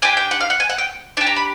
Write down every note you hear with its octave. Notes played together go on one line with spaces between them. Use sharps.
D4 G4 G#5
G5
F#5
F5
F#5
G#5
F#5
G5
D4 G4 A5
A#5
B5